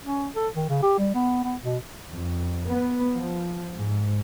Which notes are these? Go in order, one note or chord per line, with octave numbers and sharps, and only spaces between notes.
C#4
A4
D#3
C#3
G4
G3
B3
B3
B2
F2
B3
F3
G#2